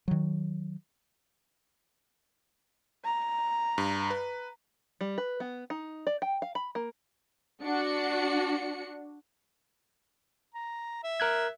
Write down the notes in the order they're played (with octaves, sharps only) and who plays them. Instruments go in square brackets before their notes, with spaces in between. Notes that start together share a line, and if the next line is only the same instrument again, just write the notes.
[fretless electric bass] D#3 F#3
[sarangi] A#5
[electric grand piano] G2
B4
[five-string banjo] G3
B4
B3
D#4
D5
G5
F5
B5
A#3
[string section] D4 F#4 C#7
[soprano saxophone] A#5
E5
[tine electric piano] A#4 F#6 G#6